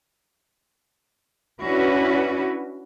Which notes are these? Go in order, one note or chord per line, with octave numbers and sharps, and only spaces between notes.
C#4 D4 E4 F#4 B4